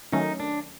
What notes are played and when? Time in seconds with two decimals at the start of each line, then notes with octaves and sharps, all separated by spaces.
0.12 D#3 F#3 A3 C#4 D#4
0.40 D4